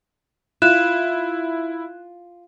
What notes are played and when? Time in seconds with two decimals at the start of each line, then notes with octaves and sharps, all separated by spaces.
0.62 E4 F4 F#6 E7